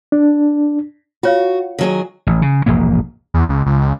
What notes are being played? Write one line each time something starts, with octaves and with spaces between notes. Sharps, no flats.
D4
F4 F#4 C#5 F5
D#3 F#3 G#4
A1
C#3
E1 A#1 G#2 A#3
E2
C#2
C#2
C#2